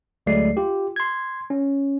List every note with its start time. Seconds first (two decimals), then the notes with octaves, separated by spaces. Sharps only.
0.26 D2 F#3 G#3 A3 D5 C7
0.57 F4 G4
0.96 C6 G#6
1.50 C#4